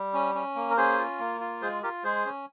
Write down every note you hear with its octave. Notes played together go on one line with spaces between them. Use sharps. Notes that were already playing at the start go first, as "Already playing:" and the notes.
Already playing: G3
C#4
C#4
A#3
A#4
C#4 G#4 C5
F4
A#3
F4
G#3 G#4 C5
F4 G4 A#4
G#3 G#4 C5
C#4